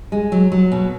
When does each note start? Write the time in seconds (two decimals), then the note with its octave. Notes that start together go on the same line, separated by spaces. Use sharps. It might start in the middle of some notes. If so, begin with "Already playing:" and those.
0.12 G#3
0.32 F#3
0.52 F#3
0.72 B2